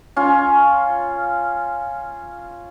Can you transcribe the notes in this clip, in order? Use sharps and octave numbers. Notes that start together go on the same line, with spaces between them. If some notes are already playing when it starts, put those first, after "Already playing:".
C#4 F4